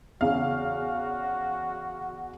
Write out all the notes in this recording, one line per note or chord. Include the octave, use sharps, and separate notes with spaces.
E2 C#3 F#4 F5